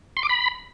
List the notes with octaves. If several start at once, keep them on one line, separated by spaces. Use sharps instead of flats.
C6
D6
B5